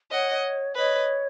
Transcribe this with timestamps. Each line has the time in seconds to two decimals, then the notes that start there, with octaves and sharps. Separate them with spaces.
0.11 C#5 D#5 F#5
0.76 B4 C#5 D#5